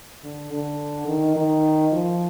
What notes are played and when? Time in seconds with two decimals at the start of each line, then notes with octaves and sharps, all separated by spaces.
0.24 D3
0.53 D3
1.08 D#3
1.36 D#3
1.93 F3